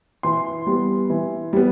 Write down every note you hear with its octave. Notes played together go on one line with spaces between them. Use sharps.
E3 C6
G3 B3
E3
G3 B3